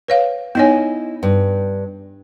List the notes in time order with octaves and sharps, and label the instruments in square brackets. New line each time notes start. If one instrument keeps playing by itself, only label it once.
[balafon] B4 C#5 F5
[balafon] B3 D#4 C#5 [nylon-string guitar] E4 D#5 G#5
[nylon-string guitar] G2